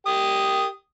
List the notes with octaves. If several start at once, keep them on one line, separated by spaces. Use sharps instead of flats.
G4 D#6